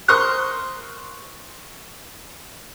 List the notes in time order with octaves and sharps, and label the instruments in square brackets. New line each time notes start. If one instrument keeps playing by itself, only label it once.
[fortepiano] A#4 C5 C#6 D#6 F6 F#6